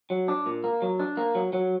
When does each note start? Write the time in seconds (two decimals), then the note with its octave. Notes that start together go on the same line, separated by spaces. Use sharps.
0.10 F#3
0.28 D4
0.46 A#2
0.64 A#3
0.82 F#3
0.99 D4
1.17 A#3
1.35 F#3
1.53 F#3